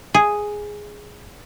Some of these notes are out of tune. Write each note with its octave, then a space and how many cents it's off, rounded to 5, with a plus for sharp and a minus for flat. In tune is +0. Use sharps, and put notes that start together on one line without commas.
G#4 +0